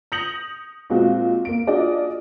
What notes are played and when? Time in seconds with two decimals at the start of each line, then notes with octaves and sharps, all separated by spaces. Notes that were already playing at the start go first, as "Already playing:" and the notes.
0.12 D#6 G6 A#6 C#7 F7 F#7
0.90 A#2 G#3 C4 F#4
1.45 A#3 D7
1.67 D4 F4 F#4 G#4 D5 D#5